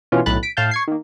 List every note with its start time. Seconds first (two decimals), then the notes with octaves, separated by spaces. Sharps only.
0.12 B2 E3 C#4 F4
0.26 B1 A2 B5 F#6 A6
0.43 B6 D7
0.57 A2 F5 A5 G6
0.71 C#6 G#6 C7
0.88 D#3 A#3